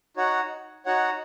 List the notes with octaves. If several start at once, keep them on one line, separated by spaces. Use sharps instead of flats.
D#4 F#4 C#5 F#5
D#4 F#4 C#5 F#5